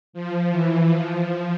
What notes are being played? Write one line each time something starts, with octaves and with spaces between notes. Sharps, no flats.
F3
E3
F3